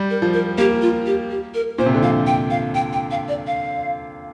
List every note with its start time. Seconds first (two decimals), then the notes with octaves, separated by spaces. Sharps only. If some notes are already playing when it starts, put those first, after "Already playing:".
Already playing: G3
0.10 A#4
0.22 F3
0.34 A#4
0.58 A#3 G4
0.82 F4
1.06 G4
1.31 G4
1.54 A#4
1.78 A#2 C5
1.86 C3
1.94 D3
2.02 F3 F5
2.27 G5
2.50 F5
2.75 G5
2.93 G5
3.11 F5
3.28 D5
3.47 F5